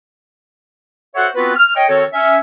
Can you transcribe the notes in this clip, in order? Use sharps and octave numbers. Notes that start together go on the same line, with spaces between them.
F#4 A4 C5 C#5 E5 F#5
B3 C4 F4 F#4 B4
F6
C#5 D#5 G5
D#3 C4 F#4 A4 C#5
C#4 E5